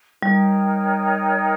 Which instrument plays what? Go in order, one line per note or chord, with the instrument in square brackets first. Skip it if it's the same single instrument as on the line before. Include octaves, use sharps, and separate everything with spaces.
[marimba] G3 [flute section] D#4 A#4 C#5 G5